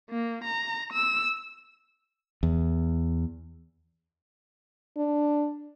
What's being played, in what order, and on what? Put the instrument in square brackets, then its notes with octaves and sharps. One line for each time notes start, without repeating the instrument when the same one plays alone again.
[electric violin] A#3
A#5
E6
[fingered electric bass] E2
[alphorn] D4